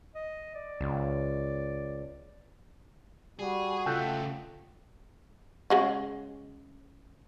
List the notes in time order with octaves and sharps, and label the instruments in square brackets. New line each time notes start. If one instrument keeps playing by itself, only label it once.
[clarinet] D#5
D5
[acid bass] C#2
[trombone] G3 [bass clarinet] F#4 [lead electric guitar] G#4
[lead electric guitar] C#3 A3 [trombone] F4 [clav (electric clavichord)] A4 F#5 G5
[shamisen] C#3 G#3 F#4